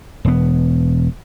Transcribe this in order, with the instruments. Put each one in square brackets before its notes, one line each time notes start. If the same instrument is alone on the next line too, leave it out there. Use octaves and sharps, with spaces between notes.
[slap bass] E1 B3